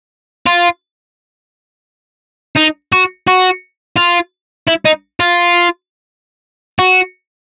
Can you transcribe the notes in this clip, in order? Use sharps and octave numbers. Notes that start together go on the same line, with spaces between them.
F4
D#4
F#4
F#4
F4
E4
D#4
F4
F#4